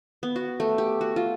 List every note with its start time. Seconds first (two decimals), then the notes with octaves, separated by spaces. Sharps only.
0.23 B3
0.36 F#4
0.60 A3
0.78 G4
1.01 F#4
1.16 F4